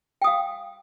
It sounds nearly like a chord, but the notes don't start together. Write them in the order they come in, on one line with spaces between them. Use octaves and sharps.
G5 D#6 F5